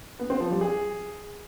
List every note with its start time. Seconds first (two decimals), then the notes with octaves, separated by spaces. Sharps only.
0.19 B3
0.30 C4
0.40 F3
0.51 G3
0.61 G#4